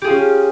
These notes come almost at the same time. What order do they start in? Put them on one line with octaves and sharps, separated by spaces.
G4 G#4 F4 C#4